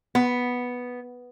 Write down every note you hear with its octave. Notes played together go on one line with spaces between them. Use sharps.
B3